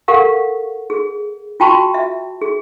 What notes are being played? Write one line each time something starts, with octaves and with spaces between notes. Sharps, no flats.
G4 A4 A#4 F5 F#5 C#6
G#4
F4 F#4 G5 A5 B5 C#6
E5
G#4